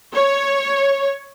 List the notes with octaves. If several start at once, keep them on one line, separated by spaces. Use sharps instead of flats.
C#5